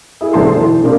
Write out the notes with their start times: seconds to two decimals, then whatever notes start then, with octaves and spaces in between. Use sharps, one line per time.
0.21 E4 G#4
0.33 B1 D3 C5 E5 A5 C6
0.55 E3 C5
0.83 C3 A#3 D4